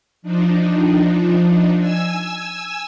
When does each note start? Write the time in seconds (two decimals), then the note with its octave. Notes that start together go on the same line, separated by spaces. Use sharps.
0.22 F3 D4 D#4
1.78 G#5 E6